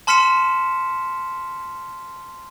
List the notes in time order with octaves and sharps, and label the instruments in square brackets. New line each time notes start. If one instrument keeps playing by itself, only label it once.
[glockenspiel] A5 C6 F6 B6 C#7 E7